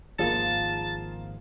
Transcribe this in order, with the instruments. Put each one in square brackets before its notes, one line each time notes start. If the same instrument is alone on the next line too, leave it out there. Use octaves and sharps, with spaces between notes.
[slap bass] G#1 D#3 F3 [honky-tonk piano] A#3 F4 G#4 [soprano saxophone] A5